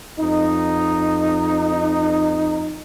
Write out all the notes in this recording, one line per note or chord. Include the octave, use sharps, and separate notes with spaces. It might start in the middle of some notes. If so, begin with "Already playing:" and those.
F2 D#4